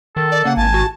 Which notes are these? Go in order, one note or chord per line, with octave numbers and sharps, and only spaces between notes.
D#3 A4
D5
C#3 A#3 F#5
G#1 G#5 A5
F#4